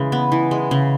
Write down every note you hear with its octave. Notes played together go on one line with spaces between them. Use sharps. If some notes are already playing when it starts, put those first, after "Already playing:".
Already playing: C#3 E3 G#3
B3
E3
G#3
C#3